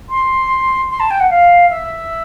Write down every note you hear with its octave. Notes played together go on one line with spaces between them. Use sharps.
C6
C6
A5
G5
F#5
F5
E5